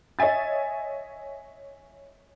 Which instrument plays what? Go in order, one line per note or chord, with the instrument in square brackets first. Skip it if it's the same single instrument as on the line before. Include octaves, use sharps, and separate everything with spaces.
[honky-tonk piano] C#5 D#5 E5 G#5 A6